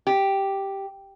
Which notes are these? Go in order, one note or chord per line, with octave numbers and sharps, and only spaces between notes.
G4